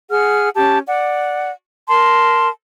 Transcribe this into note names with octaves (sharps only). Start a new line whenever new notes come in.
G#4 F#5 F6
C#4 G4 A5
D5 F#5
A#4 A5 C6